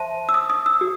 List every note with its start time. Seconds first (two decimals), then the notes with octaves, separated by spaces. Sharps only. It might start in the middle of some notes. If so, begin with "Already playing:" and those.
Already playing: C5 E5 A5 C6
0.29 E6
0.34 D#6
0.50 D#6
0.66 E6
0.81 F#4